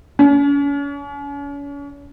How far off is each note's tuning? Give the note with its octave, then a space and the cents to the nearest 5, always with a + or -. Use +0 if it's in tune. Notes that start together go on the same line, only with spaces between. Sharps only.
C#4 +40